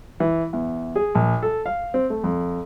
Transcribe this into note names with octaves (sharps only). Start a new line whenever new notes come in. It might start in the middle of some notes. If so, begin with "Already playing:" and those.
E3
E2
G#4
A#1
A4
F5
C4
A3
F2